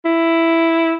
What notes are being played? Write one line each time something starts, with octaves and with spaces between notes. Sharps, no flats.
E4